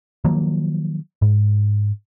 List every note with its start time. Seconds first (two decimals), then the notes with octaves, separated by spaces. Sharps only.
0.25 D#3 F3 F#3 A#3
1.22 G#2